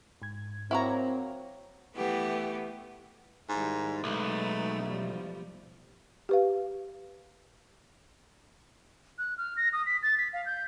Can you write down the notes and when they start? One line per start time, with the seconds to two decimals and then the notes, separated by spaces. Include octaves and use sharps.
0.22 G#2 G#6
0.71 F#3 A#3 C4 E4 C#5 A#5 C#6
1.96 E3 A3 B3 G4
3.49 G#2 D#3 G3 E4
4.04 B1 G#3 A3 D#4 B4
4.83 E2 F3 G3
6.29 G4 B4 F5
9.18 F#6
9.38 F6
9.57 A#6
9.73 D#6
9.86 B6
10.03 A6
10.18 B6
10.33 F5
10.46 G6